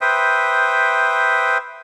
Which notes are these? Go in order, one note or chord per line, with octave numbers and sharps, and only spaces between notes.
B4 C5 E5 G5 D#6